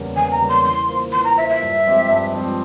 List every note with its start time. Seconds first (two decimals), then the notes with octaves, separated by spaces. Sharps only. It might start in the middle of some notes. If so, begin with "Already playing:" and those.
Already playing: E2 C#3 G3 A#3 C#4
0.16 E2 G#5
0.32 A#5
0.40 C#3 G3 A#3 C#4
0.49 C6
0.64 E3 C6
0.89 A#3 F4 C5
1.12 E3 C6
1.24 A#5
1.37 A#3 F4 C5 E5
1.49 E5
1.61 G2
1.86 F3 G#3 C4 G4
2.10 G2
2.34 F3 G#3 C4 G4